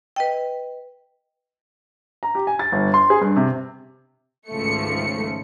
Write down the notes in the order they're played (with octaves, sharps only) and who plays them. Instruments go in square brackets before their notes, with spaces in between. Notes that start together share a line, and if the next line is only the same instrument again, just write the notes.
[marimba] B4 D#5 G5
[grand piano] A#5
G4
G#5
A6
G1
C6
G#4
G2
C3
[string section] G#1 C#2 F3 A3 C#7